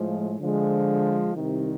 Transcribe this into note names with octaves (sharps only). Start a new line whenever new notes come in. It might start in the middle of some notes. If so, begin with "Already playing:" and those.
Already playing: A2 F3 G#3
D3 F3 G#3
C2 C3 D#3